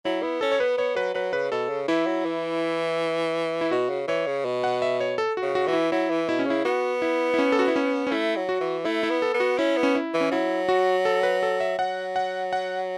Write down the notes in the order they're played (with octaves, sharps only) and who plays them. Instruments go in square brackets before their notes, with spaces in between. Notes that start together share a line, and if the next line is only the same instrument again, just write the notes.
[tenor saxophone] F#3 [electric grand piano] E4
[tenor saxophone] B3 [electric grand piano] E4
[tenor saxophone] C#4 [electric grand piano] A4
[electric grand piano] C#5
[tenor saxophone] B3 [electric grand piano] B4
[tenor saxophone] B3 [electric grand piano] C#5
[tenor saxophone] F#3 [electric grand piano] B4
[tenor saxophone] F#3 [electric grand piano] B4
[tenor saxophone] C#3 [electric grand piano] B4
[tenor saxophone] B2 [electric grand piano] A4
[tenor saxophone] C#3
[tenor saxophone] E3 [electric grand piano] E4
[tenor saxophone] F#3
E3
[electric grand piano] E4
[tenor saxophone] B2 [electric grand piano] F#4
[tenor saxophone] C#3
[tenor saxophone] E3 [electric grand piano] C#5
[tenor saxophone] C#3
B2
[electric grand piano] F#5
E5
C#5
A4
F#4
[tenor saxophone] C#3
[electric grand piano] F#4
[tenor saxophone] E3 [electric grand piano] F#4
[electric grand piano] E4
[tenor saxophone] F#3 [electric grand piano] E4
[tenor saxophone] E3
[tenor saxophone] B2 [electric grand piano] E4
[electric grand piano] C#4
[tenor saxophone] C#3 [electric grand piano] E4
[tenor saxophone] B3 [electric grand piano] F#4
[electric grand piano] E4
E4
C#4
A4
F#4
E4
C#4
C#4
[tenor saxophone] A3 [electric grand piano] E4
[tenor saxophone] F#3
[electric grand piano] F#4
[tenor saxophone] E3
[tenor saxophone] A3 [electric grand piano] E4
[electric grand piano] E4
[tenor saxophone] B3
[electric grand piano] A4
[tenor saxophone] B3
[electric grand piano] F#4
[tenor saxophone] C#4 [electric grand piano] E4
[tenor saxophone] B3
[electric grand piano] C#4
E4
[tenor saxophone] E3
[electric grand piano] C#4
[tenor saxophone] F#3 [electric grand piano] E4
[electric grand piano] F#4
A4
B4
A4
E5
[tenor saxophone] F#3 [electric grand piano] F#5
[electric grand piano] F#5
F#5